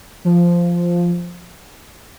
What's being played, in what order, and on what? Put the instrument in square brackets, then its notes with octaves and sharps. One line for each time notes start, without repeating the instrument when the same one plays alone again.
[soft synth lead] F3